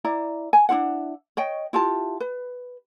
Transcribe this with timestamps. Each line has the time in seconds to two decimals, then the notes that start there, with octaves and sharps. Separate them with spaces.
0.04 E4 D5 A#5
0.53 G#5
0.69 D4 E4 F4 F#5
1.37 C#5 D#5 G5
1.73 E4 F4 G4 A5
2.20 B4